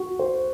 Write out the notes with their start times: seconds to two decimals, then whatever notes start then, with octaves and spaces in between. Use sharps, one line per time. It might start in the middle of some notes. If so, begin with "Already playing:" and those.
Already playing: F#4
0.19 C5